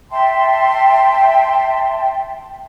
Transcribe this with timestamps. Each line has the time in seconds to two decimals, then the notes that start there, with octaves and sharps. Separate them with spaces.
0.11 E5 G5 A5 C6